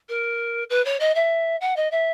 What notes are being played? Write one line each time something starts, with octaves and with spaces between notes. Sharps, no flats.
A#4
B4
C#5
D#5
E5
F#5
D#5
E5